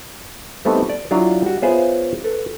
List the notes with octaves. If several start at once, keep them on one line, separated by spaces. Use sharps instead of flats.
G3 A3 B3 C4 D#4
D5
F#3 D4 E4 F4 F5
G3 F#4
B3 F4 G#4 C5 C#5 E5
A4 B4